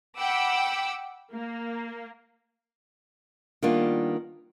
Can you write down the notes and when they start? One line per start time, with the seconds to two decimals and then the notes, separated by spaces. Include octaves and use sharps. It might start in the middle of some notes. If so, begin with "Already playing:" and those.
0.19 F#5 G5 B5 D6 E6
1.32 A#3
3.62 D#3 G3 A#3 B3 D4 F4